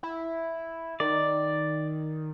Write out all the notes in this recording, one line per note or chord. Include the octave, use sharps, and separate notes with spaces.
E4
D#3 D5